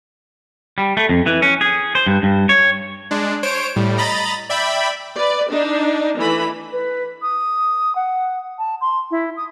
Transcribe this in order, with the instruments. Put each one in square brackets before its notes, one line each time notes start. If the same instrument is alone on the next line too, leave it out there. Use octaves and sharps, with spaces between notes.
[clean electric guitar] G3
A3
F2
E3
C#4
G#4
C5
G2
G2
C#5
[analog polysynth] G#3 D4
C5 C#5 D7
A2 G3
D#5 A#5 B5 A6
D5 E5 G5 B5
[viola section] B4 D5
D4 D#4
E3 A3 B5
[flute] B4
D#6
F#5
A5
C6
E4
D#6